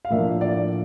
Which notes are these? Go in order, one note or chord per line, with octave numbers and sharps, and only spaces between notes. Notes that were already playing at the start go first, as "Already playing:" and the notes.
F5
A2 F3 A#3 D4 E5
D5